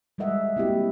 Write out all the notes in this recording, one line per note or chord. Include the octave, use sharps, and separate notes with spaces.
G3 G#3 A4 D#5 E5 F#5
A#3 C4 E4 F#4 G4